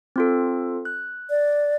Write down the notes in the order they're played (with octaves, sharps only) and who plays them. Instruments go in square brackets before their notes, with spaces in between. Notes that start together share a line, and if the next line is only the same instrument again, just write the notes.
[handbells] C4 F4 A4
F#6
[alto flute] D5